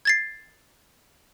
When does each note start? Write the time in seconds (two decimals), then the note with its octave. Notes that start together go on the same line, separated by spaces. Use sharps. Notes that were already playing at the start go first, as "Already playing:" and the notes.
0.05 G#6 A6 C7